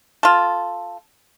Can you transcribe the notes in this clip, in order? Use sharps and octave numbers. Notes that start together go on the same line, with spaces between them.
F4 A4